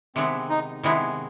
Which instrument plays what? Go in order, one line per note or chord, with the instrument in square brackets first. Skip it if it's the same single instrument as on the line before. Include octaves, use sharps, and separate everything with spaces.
[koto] C3 D#3 G#3 B3 [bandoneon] C4
[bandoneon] D#4
[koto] C3 D#3 G#3 B3 [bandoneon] E4